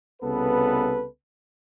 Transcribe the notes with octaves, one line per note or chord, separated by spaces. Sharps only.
C2 C#3 B3 A4 B4